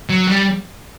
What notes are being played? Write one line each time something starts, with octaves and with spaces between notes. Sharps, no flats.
F#3
G3